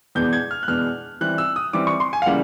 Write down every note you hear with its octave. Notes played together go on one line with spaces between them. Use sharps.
E2 B2 G#3 B3 D4 G6
G#6
F6
F#6
E2 B2 G#3 B3 D4 F6
E3 G3 C4 F#6
E6
D#6
E3 G3 C4 D6
C#6
C6
G#5
F5
C#3 E3 G3 A#3 F#5